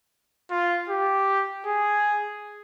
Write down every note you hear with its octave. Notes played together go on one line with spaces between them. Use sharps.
F4
G4
G#4